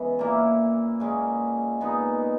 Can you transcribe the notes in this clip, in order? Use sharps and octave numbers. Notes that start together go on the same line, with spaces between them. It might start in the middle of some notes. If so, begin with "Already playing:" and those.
Already playing: C#3 E3 G#3 B3
A#2 A#3 E4
A#2 G#3 C#4
A#2 G#3 B3 D#4